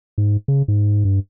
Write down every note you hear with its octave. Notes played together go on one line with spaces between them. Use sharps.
G#2
C#3
G#2
G2